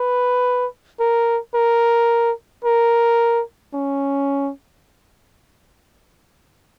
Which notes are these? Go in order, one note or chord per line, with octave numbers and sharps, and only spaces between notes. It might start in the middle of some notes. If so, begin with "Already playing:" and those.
Already playing: B4
A#4
A#4
A#4
C#4